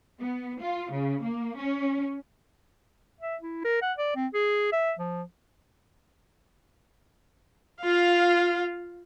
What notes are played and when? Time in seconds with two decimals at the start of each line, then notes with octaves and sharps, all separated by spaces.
0.20 B3
0.60 F4
0.91 C#3
1.22 A#3
1.57 C#4
3.21 E5
3.41 E4
3.65 A#4
3.82 F#5
3.98 D5
4.16 C4
4.34 G#4
4.72 E5
4.99 F3
7.82 F4 F5